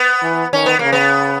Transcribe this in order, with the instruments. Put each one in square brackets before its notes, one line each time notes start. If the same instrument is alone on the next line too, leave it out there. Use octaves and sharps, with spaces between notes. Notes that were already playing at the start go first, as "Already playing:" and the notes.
Already playing: [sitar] B3
[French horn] E3
[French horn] D#3 [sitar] C#4
[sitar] B3
[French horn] C#3 [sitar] A#3
[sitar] B3